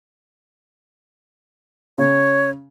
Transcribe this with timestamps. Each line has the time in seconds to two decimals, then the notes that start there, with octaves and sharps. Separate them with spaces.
1.98 C#3 C#5